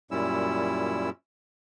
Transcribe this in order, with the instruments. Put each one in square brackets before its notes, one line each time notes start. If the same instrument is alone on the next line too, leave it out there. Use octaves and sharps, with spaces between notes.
[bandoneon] F#2 A#2 G3 C#4 E4 E6